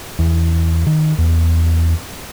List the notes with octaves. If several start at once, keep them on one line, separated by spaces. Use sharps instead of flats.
E2
D#3
E2